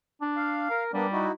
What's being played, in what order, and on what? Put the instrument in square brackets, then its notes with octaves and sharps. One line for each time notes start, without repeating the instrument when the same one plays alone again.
[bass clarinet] D4
[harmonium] F5
[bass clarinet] A#4
[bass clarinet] G3 [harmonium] A#3 B3 D4
[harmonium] D#4 E4 F#4